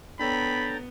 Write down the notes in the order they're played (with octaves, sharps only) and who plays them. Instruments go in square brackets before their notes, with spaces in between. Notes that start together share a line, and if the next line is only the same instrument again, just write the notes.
[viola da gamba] B3 [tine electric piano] D4 A4 C#5 [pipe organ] G5 A#5 A6 [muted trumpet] B5